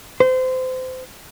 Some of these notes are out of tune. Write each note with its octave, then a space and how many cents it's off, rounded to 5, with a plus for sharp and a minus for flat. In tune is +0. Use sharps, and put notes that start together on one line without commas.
C5 -25